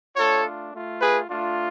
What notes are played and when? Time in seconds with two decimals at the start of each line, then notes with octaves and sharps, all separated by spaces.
0.17 A3 D4 F4 A4 C#5
0.73 A3 F4
1.01 G#4 B4
1.30 A3 D4 F4